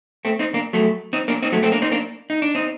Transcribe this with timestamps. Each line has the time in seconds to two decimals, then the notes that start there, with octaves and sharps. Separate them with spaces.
0.25 A3 C4
0.39 C4 D#4
0.54 A#3 D4
0.73 F#3 A3
1.13 C4 D#4
1.28 A#3 D4
1.43 C4 D#4
1.52 F#3 A3
1.63 A3 C4
1.72 A#3 D4
1.82 C4 D#4
1.92 A#3 D4
2.30 D#4
2.42 D4
2.55 C4 D#4